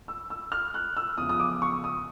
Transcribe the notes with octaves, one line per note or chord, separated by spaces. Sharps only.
E6
E6
F6
F#6
E6
E2 C#3 F3 D#6
D#6
D6
C#6
D#6